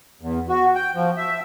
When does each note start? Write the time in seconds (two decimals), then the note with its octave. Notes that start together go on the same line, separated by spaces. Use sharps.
0.21 E2
0.49 F#4
0.75 G5
0.95 F3
1.17 E5